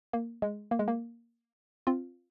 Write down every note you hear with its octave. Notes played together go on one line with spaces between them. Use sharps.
A#3
G#3
A#3
G#3
A#3
C4 F4